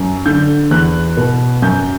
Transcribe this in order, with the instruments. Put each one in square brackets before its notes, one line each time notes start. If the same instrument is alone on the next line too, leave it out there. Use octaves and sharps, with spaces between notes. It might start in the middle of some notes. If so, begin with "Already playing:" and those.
Already playing: [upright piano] F#2
D3 G6
E2 F#6
B2
F#2 G6